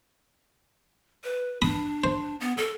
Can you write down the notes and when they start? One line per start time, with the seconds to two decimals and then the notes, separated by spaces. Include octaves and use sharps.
1.24 B4
1.62 D4 B5 D#6
2.04 C5
2.40 B3
2.57 A4